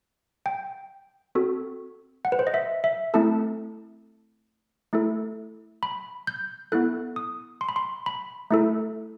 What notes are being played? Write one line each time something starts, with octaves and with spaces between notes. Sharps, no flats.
G5
C4 F#4 A4
F#5
B4
C5
D#5
E5
E5
A3 C4 E4 A4 A5
A3 E4 A4
B5
G6
B3 E4 A4 F#6
D#6
C6
B5
C6
B5
A3 E4 A4